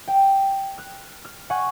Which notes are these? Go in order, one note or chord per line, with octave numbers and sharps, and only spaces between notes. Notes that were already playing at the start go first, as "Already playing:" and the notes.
G5
F6 F#6
F6
F#5 G#5 C#6